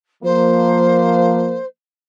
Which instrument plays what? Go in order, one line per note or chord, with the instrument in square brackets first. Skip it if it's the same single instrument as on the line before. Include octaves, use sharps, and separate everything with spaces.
[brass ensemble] F3 A#3 [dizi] C5